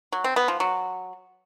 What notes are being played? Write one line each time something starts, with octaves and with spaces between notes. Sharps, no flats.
F#3
C4
B3
F3
F#3